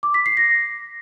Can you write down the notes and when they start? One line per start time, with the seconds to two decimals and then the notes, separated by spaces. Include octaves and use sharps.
0.03 D6
0.14 B6
0.26 C7
0.37 A#6